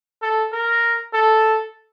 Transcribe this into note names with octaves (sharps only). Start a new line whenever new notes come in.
A4
A#4
A4